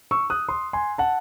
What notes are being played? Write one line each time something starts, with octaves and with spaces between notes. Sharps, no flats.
C#6 E6
D#6 F#6
C6 D#6
G#5 C6
F#5 A5